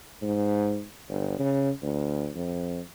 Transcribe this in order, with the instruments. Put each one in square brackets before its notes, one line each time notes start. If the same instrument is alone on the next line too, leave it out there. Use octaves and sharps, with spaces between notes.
[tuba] G#2
G1
C#3
D2
F2